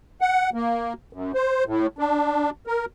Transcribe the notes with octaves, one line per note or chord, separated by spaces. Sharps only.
F#5
A#3
F#2
C5
A2
D4
A#4